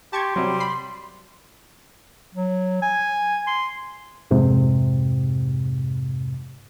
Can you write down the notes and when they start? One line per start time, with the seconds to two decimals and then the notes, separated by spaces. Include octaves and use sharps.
0.13 G4 A5 C6 C#6 G#6
0.36 C3 F#3 G3
0.60 B5 C7
2.34 F#3
2.82 G#5
3.47 C6
4.31 F2 G#2 C3